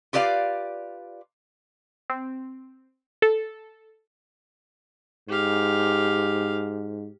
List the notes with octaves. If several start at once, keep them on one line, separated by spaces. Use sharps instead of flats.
F4 G4 B4 D5 F5
C4
A4
G#2 G4 F5